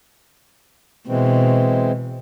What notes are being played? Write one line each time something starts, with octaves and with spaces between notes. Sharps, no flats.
B2 E3 G#3 C4